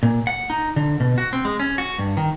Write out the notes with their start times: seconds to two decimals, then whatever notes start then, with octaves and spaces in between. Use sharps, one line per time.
0.03 A#2
0.27 F#5
0.50 D#4
0.76 D3
1.00 B2
1.18 F#4
1.33 C4
1.45 G#3
1.60 C#4
1.78 F#4
1.99 G2
2.17 D#3